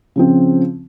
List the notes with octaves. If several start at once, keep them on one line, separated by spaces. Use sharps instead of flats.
C#3 F3 C4